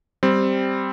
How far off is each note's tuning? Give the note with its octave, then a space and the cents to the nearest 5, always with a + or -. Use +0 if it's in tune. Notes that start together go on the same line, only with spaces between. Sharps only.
G3 +0 C4 +0